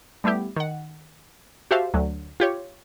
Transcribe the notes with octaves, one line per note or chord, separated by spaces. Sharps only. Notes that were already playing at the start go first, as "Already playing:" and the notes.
G3 A3 B3 E4 G4
D#3 F#5
F#4 G4 A4 C5 E5 F5
D2 D3 F#3
F4 G4 C#5